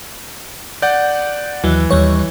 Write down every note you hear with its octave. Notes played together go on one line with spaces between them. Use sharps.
D5 F#5 G6
D#2 E3 F#3
D#2 G3 C#5